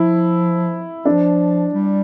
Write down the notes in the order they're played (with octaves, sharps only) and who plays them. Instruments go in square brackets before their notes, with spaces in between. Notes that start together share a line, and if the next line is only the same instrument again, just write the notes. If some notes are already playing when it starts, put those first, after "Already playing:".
Already playing: [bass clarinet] F3 [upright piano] E4
[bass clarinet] F3 [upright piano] D4
[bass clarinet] G3